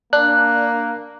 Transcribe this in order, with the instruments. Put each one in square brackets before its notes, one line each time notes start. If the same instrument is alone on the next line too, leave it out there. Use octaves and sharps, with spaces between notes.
[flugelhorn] A#3 [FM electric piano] D4 [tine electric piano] F#6